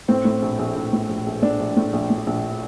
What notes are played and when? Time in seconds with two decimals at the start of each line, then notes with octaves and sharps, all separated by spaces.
0.08 A2 C4
0.25 A2
0.42 A#1
0.59 A#1
0.76 A#1
0.93 A2
1.09 A#1
1.26 A#1
1.42 A2 D4
1.60 A#1
1.77 A2
1.93 A#1
2.10 A2
2.27 A#1